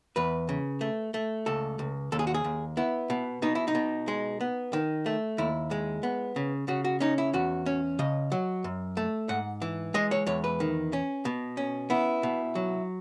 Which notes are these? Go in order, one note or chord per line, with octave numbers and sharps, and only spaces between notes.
E2 B4
C#3
A3
A3
C#2 A4
C#2
D#2 A4
G#4
F#4
G#4
D#2
B3 E4
B2
B2 D#4
E4
D#4
B2
G#3
B3
D#3
A3
D#2 E4
G#3
B3
C#3
C#3 F#4
F#4
C#4 D#4
E4
E2 F#4
C#4
C#3 D#5
F#3
F#2
A3
G#2 F#5
E3
G#3 D#5
C#5
E2 C#5
B4
D#3
C#4
B2
C#4
B3 E4
B2
F#3